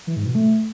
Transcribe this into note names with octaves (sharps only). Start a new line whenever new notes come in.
E3
G#2
B2
A3